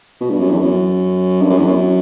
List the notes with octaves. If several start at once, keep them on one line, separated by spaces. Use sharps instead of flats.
B2
G2
F#2
E2
F#2
G2
F#2
E2
F#2